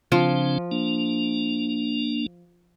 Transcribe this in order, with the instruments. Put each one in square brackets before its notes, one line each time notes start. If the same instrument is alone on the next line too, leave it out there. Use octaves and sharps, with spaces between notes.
[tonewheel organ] C#3 C4 D4 [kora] F3
[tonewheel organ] A#3 D4